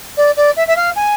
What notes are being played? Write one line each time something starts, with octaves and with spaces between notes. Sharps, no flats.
D5
D5
E5
E5
F5
G#5